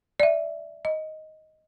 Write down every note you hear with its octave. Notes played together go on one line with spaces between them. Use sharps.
D5 E5
D#5